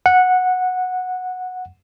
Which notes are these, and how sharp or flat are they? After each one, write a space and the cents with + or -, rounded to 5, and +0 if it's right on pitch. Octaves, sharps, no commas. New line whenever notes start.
F#5 -10